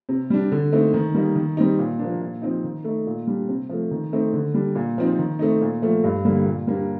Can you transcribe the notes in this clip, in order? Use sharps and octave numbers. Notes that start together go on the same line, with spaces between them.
C3
G3 D4
D3
A3 C4 D#4
D#3
G3 A#3 D#4
D#3
G3 C4 D#4
A#2
F3 A#3 D4
A#2
F3 C4 D#4
D#3
A3 D#4
A#2
G3 D4
C3
F3 A3
D#3
A3 C4 D#4
D3
G3 D4
A#2
F3 C4 D#4
D#3
A3 C4 D#4
A#2
F3 A3
G2
D3 G3 A#3
A#2
G3 A#3 D4